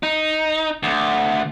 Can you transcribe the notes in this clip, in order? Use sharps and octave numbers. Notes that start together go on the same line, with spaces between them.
D#4
D2